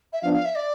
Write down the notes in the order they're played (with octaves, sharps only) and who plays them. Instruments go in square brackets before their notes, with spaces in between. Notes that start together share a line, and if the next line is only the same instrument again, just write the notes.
[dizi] E5
[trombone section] F3 B3 D4 [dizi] F5
[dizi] F5
E5
D5